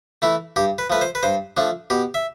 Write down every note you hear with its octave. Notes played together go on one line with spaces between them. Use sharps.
E3 A3 E4
G2 G4
B4
F3 A3 B4
C5
B4
G2 C5
F3 A3 D4
B2 G4
E5